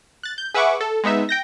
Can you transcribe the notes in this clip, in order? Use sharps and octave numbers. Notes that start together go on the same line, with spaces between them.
F#6 A6
G6
G#4 B4 E5 F#5 C#6 D6
A4
G#3 B3 D#4 E5
G5 G6 A#6